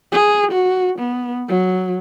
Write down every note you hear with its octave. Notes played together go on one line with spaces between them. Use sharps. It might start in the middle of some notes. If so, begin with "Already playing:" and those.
G#4
F#4
B3
F#3